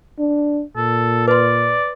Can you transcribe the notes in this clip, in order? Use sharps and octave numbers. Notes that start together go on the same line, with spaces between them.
D4
A#2 A4
B4 D5 C6